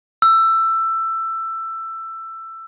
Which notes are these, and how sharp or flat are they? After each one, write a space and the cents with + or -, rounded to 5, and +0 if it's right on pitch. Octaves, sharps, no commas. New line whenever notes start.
E6 +15